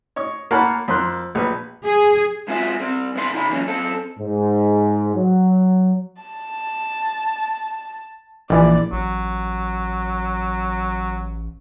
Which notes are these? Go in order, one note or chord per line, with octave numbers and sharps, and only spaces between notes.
C#5 D#5 C#6
A#3 A#4 C#5 F#5 A5 B5
F2 C4 A#4 C6 F#6
A#1 B4
G#4
G#3 C4 F4 F#4 B4 E5
G3 C4
G2 B2 D3 E4 B4 C6
C#3 D#4 E5 B5
E3 F#3 G3 A#3 C#4 D#4
F#2 C4 A4
G#2
F#3
A5
A#1 E3 D5
A1 F#3